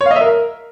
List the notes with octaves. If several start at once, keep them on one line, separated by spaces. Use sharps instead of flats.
C#5
F5
D#5
E5
A#4